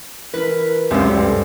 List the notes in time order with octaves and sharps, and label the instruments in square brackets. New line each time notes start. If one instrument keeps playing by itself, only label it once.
[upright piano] E3 [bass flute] A#4 [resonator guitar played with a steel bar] B4
[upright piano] C#2 F#2 G4 [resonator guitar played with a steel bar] C3 C5 [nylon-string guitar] G#3 C#4
[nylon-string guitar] G2 [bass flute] A4